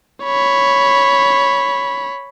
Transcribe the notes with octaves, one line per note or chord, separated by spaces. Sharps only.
C#5 B5